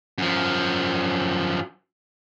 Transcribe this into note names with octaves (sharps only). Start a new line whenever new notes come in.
F#2 F3